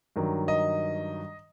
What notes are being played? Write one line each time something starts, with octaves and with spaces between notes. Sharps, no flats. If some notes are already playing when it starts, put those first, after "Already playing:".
G2 D#3 F#3
D#5